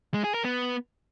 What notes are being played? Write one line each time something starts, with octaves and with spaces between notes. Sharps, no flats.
G#3
G#4
A#4
B3